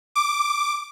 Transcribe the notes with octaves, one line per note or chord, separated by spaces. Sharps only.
D6